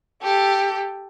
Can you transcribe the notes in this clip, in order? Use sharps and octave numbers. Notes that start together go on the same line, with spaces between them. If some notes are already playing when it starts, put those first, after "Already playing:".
G4 A4